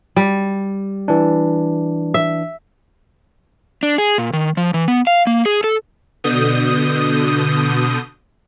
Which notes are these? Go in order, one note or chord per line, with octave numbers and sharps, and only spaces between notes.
G3
E3 D4
E5
D4
G#4
A#2
D#3
F3
E3
B3
F5
A#3
G#4
A4
B2 D3 D#6 G6